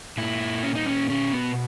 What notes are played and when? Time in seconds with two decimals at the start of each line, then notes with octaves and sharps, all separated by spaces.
0.18 A#2 E4
0.63 C#4
0.75 D#4
0.86 C#4
1.09 B2 C#4
1.33 B3